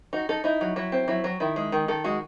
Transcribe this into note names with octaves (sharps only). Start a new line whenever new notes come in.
D#4 F#4
D#4 A4
D#4 E4
F#3
F#3 E4
C4
F#3 E4
F#3
D#3 E4
G#3
D#3
D#3 A4
G#3 F#4